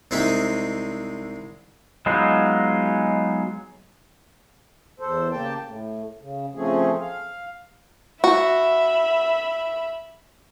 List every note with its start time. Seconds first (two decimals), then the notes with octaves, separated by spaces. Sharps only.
0.11 C2 G#3 C4 D#4 E5
2.06 F#3 G#3 B3 D#4 F4
5.00 E2 A4 C5
5.31 C#3 A#3 G4 G5 A5
5.63 A2
6.20 C#3
6.55 C#3 F3 A3 C4 C#4 G#4
7.00 F5
8.24 F#4 E5 B5